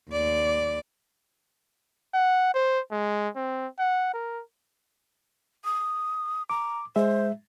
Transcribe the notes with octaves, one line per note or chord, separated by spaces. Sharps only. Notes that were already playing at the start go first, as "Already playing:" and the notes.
D#2 D5
F#5
C5
G#3
C4
F#5
A#4
D#6
A#5 D6
G#3 C5 E5